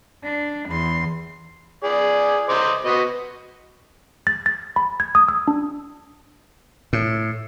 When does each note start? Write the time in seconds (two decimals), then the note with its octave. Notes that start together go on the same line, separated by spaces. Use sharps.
0.25 D4
0.69 E2 C6
1.83 G#4 D5
2.49 C5 D#5 D6
2.85 B3 F#4 D#5
4.27 A6
4.46 A6
4.76 B5
5.00 G#6
5.15 D#6
5.28 E6
5.48 D4
6.93 A2